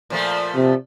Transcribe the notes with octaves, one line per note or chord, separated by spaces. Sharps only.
A#2 F3 A3
C3